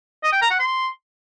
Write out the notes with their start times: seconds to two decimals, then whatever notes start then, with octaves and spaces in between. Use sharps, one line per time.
0.24 D#5
0.33 G5
0.42 A#5
0.51 F#5
0.59 C6